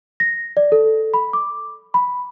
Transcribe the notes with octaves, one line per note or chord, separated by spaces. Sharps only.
A#6
D5
A4
B5
D6
B5